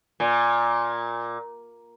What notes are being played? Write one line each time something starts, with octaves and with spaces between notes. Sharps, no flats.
A#2